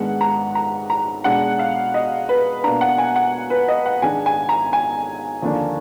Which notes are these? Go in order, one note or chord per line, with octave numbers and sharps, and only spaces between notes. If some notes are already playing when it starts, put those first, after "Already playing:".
Already playing: G#2 D#3 G#3 B3 D4 F#5
A#5
A#5
A#5
B2 G#3 D4 F#5
F5
D#5
B4
B2 A#3 D4 A#5
F#5
G#5
F#5
B4
D#5
F#5
G#2 D#3 G#3 D4 G#5
G#5
A#5
G#5
D#2 D3 F3 A#3 D4